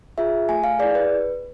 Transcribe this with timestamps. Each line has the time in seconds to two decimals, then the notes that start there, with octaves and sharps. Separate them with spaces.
0.18 F4 G#4 E5
0.49 A3 G#5
0.64 F5
0.79 E4 G#4 D5
0.95 B4